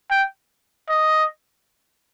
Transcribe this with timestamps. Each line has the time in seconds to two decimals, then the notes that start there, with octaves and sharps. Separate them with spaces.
0.11 G5
0.89 D#5